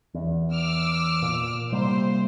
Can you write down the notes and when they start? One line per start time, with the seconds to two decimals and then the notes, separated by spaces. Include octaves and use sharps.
0.14 E2
0.52 D6 E6 F6
1.22 A#2
1.72 C3 G3 A#3 C5